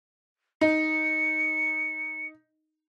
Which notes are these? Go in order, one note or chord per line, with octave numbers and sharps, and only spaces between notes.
D#4 C#7